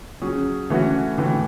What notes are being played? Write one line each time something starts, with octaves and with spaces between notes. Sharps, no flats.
F#3 C#4 G#4
E3 A3 C#4 F#4
A2 E3 A3